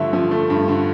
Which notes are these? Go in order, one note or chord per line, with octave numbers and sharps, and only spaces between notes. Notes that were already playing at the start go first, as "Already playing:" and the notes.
Already playing: G2 D3 F3 A3 E5
F3
A3
G2
D3